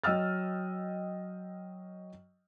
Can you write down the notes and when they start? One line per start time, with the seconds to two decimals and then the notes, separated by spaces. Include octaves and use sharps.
0.04 F#3 D#5 G5 E6 F6 A6